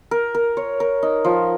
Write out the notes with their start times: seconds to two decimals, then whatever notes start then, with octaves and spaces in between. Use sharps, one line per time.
0.11 A#4
0.35 A#4
0.57 C#5
0.80 A#4
1.03 D#4
1.25 F3